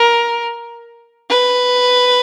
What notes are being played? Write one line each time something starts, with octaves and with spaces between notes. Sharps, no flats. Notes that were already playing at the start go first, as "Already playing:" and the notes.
Already playing: A#4
B4